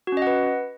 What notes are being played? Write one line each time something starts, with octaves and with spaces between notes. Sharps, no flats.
C#4 F#4 B4 D#5 F#5